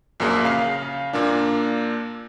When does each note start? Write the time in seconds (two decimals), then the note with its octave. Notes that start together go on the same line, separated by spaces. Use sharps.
0.20 A#1 F#2 A#3 G#4
0.44 C#3 F5 C7
1.13 A#2 A#3 D4